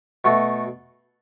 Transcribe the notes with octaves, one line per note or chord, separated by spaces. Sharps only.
B2 A3 F#4 A4